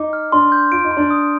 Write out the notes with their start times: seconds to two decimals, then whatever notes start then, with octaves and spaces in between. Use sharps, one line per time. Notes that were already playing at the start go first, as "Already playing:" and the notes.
Already playing: D#4 D6
0.13 F6
0.32 D4 C6
0.52 G6
0.71 F4 D7
0.84 D#4
0.91 C6
0.97 D4
1.10 D#6